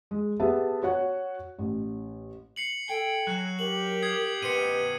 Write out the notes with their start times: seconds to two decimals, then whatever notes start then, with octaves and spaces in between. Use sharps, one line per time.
0.11 G#3
0.40 B3 G4 G#4 E5 A5
0.83 F#4 C#5 F#5
1.58 A1
2.56 C7 C#7 F#7
2.89 A4 G5 G#5
3.27 F#3 F#6
3.59 G4 A#4 F#7
4.03 D#6 G#6 C7
4.42 B2 B4 C5 C#7 D#7